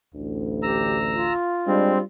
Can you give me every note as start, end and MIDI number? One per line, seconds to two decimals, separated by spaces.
0.15 1.35 33
0.15 1.35 38
0.63 0.98 67
0.63 1.33 82
0.63 1.33 88
1.14 2.03 65
1.67 2.00 55
1.67 2.00 56
1.67 1.98 60
1.67 2.00 62